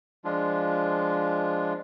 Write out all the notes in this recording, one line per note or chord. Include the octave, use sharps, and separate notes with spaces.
F3 G#3 D4 F4